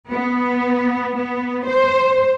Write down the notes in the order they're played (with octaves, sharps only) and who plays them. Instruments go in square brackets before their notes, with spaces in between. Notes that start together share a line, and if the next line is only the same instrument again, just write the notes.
[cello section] B3
B3
C5